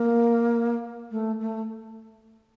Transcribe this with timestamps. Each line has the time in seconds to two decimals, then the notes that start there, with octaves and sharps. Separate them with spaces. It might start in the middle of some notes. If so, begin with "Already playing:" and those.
Already playing: A#3
1.11 A3
1.40 A3